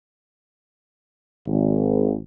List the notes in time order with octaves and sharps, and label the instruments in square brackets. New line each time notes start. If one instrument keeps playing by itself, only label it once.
[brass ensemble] G#1